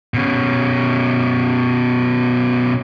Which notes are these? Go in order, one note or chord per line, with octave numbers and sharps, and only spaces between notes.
B2 C#4